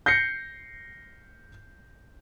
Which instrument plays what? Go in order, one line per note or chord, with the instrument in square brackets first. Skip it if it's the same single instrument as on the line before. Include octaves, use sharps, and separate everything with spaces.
[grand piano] G6 A#6 C7 C#7